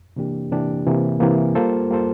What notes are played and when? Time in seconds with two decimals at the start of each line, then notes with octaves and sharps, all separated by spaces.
0.16 C3 E3 A#3 D4 G4
0.51 C3 E3 A#3 D4 G4
0.87 C3 E3 A#3
1.20 C3 E3 A#3
1.55 G3 A#3 F4 A4 C5
1.90 G3 A#3 F4 A4 C5